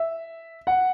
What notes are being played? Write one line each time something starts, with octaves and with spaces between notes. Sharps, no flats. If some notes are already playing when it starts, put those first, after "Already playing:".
Already playing: E5
F#5